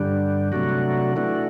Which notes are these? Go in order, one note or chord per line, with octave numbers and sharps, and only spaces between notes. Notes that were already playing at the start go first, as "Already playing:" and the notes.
Already playing: G2 D3 G3 D4
C3 F#3 A3 D4 F#4
E3 A3 D4 F#4